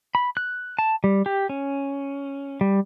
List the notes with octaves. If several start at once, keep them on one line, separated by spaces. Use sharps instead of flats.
B5
F#6
A5
G3
G4
C#4
G3